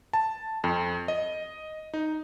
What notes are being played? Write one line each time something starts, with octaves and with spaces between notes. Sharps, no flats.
A5
F2
D#5
D#4